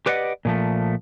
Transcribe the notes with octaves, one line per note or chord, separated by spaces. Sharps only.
G4 B4 D5 D#5 F#5
A#2 F3 A3